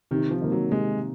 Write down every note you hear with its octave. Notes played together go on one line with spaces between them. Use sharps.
C3 D#3
F3
D#3 A#3
F#3
C3 G#3